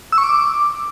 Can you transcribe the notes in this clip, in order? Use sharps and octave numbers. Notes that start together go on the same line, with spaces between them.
E6
C#6
D6